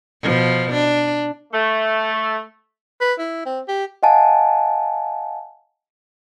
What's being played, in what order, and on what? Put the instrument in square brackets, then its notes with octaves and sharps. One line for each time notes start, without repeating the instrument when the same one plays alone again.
[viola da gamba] B2 F3
D4
[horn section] A3
[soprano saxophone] B4
E4
C4
G4
[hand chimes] D#5 F5 F#5 G#5 A5